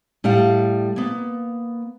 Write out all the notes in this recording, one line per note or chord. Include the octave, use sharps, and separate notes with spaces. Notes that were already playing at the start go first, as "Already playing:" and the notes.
A2 G3 F5 F#5 A5
A#3 B3